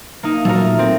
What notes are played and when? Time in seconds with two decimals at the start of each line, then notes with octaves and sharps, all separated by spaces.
0.23 A#3 D#4
0.45 A#2 F#3 A3 A#4
0.79 C4